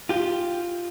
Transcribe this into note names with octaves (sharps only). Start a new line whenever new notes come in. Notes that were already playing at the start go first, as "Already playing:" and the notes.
F4 G4